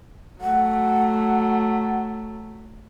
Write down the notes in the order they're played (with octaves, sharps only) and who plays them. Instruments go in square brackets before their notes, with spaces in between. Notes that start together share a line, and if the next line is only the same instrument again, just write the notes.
[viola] F#3 A3 [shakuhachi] F#5